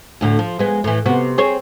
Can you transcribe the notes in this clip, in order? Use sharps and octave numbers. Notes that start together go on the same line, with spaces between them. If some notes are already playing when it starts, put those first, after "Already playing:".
D2 A2 D3
F3
G#3 B3
A2 E3
C3 B3 F#4
C4 G#4 C#5